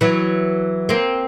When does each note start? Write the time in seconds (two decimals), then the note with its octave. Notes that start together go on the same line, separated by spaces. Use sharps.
0.01 E3 F#3
0.89 A#3 C4